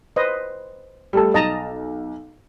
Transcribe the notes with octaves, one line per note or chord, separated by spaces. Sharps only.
B4 C5 D#5
G3 A3 A4
B1 D#5 A5 A#5